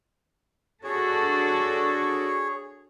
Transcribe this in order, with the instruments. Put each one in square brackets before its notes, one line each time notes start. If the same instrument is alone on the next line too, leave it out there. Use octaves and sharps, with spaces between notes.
[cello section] D4 F#4 A4 [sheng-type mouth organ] G#4 C#5